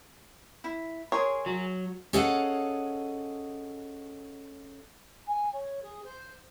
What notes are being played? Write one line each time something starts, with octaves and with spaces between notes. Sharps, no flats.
E4
G#4 A#4 C#5 C6
F#3
C#4 G#4 A4 D#5 F5 F#5
G#5
C#5
G#4
C5